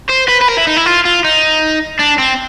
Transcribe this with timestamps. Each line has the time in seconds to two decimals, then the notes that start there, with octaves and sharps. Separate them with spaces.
0.10 C5
0.28 B4
0.41 B4
0.48 A#4
0.57 E4
0.67 D#4
0.76 E4
0.86 F4
1.05 F4
1.25 D#4
2.00 D4
2.19 C4